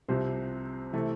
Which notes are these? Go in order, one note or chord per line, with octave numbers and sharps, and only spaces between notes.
C2 C3 F3 C5
C3 E3 A3